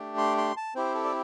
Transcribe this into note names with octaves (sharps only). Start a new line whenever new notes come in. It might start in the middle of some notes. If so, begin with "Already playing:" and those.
Already playing: A3 D4 G4
C6
C6
A5
C4 E4 G4 C5
A4
D5